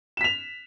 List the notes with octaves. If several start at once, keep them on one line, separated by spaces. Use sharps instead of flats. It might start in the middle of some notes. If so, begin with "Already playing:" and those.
B6 E7 F7